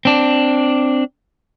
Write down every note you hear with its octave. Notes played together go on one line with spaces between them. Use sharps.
C4 D4